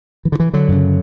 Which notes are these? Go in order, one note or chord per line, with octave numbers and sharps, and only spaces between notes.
E3
D3
E3
D3 F#3
F#2 C#3